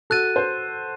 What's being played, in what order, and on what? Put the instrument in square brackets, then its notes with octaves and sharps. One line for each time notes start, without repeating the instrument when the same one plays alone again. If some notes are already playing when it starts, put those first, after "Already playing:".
[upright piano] F#4 A4 [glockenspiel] F#6 A6 D#7
[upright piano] C5